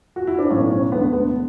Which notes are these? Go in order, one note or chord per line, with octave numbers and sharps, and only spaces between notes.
F#4
E4
D4
B1 A2 E3 C#4
C#4
E1 D2 D3 B3
B3